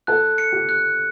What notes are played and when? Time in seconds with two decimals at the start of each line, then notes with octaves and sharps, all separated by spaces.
0.07 A4 F#6
0.38 C#7
0.52 G4
0.69 F#6